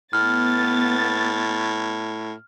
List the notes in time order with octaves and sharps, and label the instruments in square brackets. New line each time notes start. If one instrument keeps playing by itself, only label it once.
[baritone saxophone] A2 [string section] B3 A6 [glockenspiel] F6